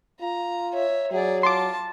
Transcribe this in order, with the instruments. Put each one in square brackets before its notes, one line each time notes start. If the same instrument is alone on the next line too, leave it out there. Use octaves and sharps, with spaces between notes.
[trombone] F4 [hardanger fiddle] A#5
[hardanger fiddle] C#5 E5
[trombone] F#3 [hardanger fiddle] G#4 D5
[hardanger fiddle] F4 A5 [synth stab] C6 D6